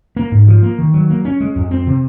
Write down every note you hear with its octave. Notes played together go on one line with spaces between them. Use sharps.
A#3
G#2
F3
A#3
D#3
F#3
A#3
C#4
G#3
F2
C4
C3